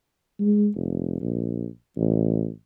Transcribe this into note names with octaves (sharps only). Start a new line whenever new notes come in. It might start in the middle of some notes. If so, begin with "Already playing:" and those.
G#3
F1
A#1
A1